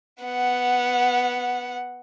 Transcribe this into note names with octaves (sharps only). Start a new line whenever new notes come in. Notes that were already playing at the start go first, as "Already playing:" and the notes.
B3 F#5